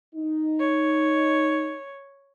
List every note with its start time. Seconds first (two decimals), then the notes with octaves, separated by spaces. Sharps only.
0.16 D#4
0.59 C#5